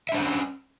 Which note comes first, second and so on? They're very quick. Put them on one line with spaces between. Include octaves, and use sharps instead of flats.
E5 D4 C5 F#5 C#4